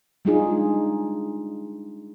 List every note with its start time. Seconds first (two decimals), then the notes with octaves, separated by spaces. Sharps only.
0.25 G3 G#3 D4 D#4 F4 G#4